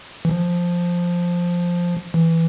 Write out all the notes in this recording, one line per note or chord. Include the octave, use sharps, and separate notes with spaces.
E3
F3
E3